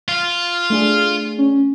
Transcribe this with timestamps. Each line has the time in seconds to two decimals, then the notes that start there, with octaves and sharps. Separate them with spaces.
0.09 F4
0.70 A3 D4 G#4
1.38 C#4